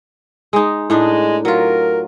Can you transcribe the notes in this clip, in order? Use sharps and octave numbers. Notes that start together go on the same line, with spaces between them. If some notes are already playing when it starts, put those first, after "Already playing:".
G#3 D#4
A2 G#3 D4 D#4
F#3 F4 A#4